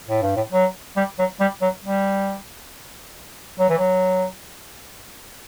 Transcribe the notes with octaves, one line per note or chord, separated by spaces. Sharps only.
A2
G2
A2
F#3
G3
F#3
G3
F#3
G3
F#3
E3
F#3